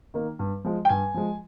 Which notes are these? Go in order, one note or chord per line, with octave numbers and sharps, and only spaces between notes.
D#3 A#3
G2
F3 G#3
G5
G2 G#5
F3 G#3